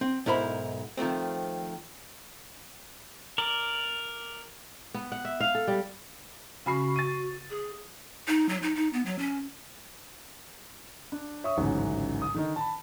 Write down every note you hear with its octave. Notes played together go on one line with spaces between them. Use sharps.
C4
B1 G#2 E4 A#4 C5 B5
D#3 F3 A3 C4
A#4 D5
B3
F#5
E5
F5
A4
G3
C#3 F#4 B5 C7
A6 D#7
G#4
D#4
F#3
D#4
D#4
B3
F#3
C#4
D4
C#5 E5 C#6 D#6
A1 D2 G#2 C#3 E3 F#3
D#6
D3 D#3 D#4
A5 B5